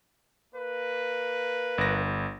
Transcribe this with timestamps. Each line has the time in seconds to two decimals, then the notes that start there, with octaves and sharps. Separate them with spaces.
0.56 A#3 B4
1.78 G1 A#6